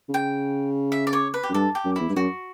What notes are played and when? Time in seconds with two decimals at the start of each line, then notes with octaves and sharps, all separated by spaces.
0.09 C#3
0.14 G5
0.92 E5
1.07 D5
1.13 C#5
1.34 B4
1.43 G4
1.50 F#2
1.53 G2 A4
1.75 G4
1.85 F#2
1.96 E2 E4
2.09 G2
2.16 F#2 F#4